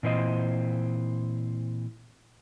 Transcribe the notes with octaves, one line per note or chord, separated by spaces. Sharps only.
A#2 E3 C4 C5 D#5